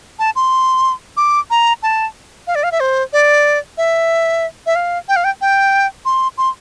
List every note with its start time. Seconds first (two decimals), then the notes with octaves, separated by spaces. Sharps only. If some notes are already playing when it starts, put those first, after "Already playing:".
0.19 A5
0.36 C6
1.17 D6
1.50 A#5
1.83 A5
2.47 F5
2.55 D5
2.63 F5
2.72 E5
2.80 C5
3.13 D5
3.77 E5
4.66 E5
4.75 F5
5.08 G5
5.16 F5
5.24 G5
5.41 G5
6.05 C6
6.38 C6